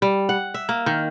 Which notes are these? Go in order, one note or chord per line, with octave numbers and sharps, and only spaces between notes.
G3
F#5
E5
A#3
D#3